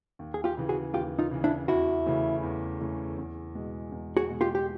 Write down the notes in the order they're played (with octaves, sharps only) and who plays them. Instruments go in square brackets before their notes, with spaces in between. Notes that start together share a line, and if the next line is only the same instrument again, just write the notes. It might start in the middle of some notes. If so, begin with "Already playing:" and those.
[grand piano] D#2
[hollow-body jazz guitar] G#4
F4 G4
[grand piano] C#3 E3
[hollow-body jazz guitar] F#4 G#4
[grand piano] D#2 [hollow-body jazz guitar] F4 G4
[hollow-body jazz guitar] D#4 F4
[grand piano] C#3 E3
[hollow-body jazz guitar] D4 E4
[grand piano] E2 [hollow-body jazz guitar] E4 F#4
[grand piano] C#3 E3 A3 C#4
E2
C#3 E3 A3 C#4
E2
B2 G#3
E2
[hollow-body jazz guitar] F#4 G#4
[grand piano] B2 G#3
[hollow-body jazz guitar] F4 G4
G4